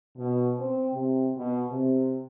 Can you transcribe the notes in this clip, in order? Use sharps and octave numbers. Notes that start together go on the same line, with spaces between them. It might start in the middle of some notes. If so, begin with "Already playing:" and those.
B2
C4
C3
B2
C3